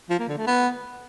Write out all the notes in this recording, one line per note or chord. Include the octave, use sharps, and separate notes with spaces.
F3
A#3
D3
A3
B3